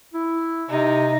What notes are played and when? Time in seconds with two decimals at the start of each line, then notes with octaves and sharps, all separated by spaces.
0.13 E4
0.70 C3 D#4